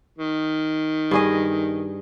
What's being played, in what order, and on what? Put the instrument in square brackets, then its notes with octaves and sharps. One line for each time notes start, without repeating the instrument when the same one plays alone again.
[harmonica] D#3
[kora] G2 G#4 D#5